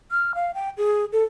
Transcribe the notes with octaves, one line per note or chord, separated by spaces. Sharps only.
F6
F5
G5
G#4
A4